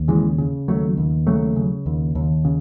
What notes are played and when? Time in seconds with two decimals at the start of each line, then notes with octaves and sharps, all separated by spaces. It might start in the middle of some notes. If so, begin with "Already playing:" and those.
Already playing: D#2
0.08 C#3 E3 G#3
0.38 C#3
0.68 D#2 F#3 A3
0.97 D#2
1.27 C#3 F#3 A3
1.56 C#3
1.86 D#2
2.15 D#2
2.45 C#3